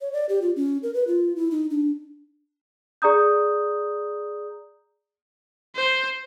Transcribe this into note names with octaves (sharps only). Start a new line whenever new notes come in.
C#5
D5
G4
F4
C#4
A#4
B4
F4
E4
D#4
D4
G#4 D5 A#5 D#6 G6
C5